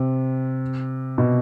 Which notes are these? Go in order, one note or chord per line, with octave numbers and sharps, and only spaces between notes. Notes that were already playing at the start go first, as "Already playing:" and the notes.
Already playing: C3
B2